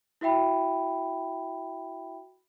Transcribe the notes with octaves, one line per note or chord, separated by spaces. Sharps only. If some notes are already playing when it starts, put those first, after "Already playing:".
E4 F#4 E5 G5 B5